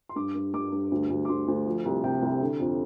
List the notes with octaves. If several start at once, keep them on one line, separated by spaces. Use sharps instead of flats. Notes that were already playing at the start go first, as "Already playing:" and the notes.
C6
G2 D6
G2
G2 D6
G2
D2
D2
D6
D2 C6
D2
F3
C2
C3 G5
C2
D3
F2